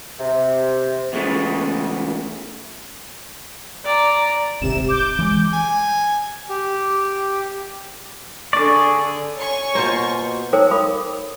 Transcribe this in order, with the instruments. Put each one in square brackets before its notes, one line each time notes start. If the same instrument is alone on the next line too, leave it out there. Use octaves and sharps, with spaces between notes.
[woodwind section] C3
[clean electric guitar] E2 C#3 G#3 A3
[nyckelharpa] D5 [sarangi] A#5
[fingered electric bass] D#1 G#1 [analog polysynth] C3 E7
[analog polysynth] D6 G6
[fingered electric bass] E3 G#3
[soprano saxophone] G#5
[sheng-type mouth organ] G4
[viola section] D3 [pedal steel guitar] G#4 D5 [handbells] C#6
[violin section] C#5 G#5 C#6
[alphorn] B2 [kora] A#3 F4 [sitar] C5
[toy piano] D#4 A4 A#4 C5 C#5 G5
A#4 F5 B5 D6 D#6